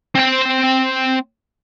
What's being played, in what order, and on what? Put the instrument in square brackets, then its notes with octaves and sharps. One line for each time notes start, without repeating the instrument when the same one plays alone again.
[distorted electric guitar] C4 G5